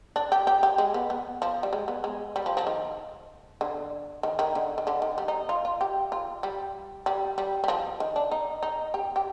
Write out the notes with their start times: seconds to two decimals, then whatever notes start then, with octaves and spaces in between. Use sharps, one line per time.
0.16 D4
0.32 G4
0.47 G4
0.63 G4
0.78 G#3
0.94 B3
1.10 B3
1.42 F3
1.63 G3
1.73 G#3
1.88 B3
2.04 G#3
2.36 G3
2.46 F3
2.57 F3
2.67 D#3
3.61 D3
4.23 D#3
4.39 D#3
4.55 D3
4.78 D#3
4.87 D3
5.02 D#3
5.18 G3
5.28 D#4
5.49 F4
5.65 F4
5.81 G4
6.12 F4
6.43 G3
7.06 G3
7.38 G3
7.64 G3
7.68 F3
8.00 D#3
8.16 D4
8.31 D#4
8.63 D#4
8.94 G4
9.16 G4